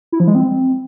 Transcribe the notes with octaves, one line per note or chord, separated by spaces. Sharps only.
E4
F3
G#3
C4